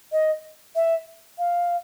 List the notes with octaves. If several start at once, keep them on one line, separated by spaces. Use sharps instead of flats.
D#5
E5
F5